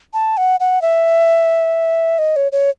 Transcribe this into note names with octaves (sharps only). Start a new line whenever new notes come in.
A5
F#5
F#5
E5
D#5
C#5
C#5